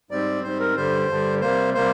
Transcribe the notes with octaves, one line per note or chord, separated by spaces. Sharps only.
G#2 G3 C4 D5
G#2 G3 C4 C5
A#4
G2 D3 G3 C5
G2 D3 G3
C3 G3 A#3 C5
C3 G3 A#3 C5